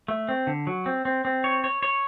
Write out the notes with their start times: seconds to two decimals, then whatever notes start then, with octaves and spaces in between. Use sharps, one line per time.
0.08 A3
0.29 C4
0.47 D3
0.67 F#3
0.86 C4
1.05 C4
1.25 C4
1.44 C#5
1.64 C#5
1.83 C#5